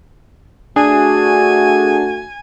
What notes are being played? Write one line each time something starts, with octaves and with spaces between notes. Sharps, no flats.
A3 D4 F#4 G#4 G#5